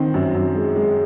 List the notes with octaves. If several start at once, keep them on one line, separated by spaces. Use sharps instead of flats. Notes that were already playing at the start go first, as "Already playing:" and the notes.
Already playing: D#3 C4
F#2
F#2
G#3
G#3